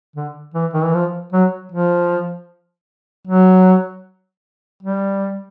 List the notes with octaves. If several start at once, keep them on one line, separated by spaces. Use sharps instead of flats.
D3
E3
D#3
E3
F3
F#3
F3
F#3
G3